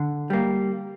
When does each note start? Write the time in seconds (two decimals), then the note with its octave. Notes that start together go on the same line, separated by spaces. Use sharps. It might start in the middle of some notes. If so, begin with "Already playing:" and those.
Already playing: D3
0.30 G3 A#3